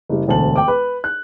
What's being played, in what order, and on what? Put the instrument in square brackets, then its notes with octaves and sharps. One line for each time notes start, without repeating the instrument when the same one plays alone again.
[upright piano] F#1 G3
E1 D2 A5 F#7
G5 D6
B4
F#6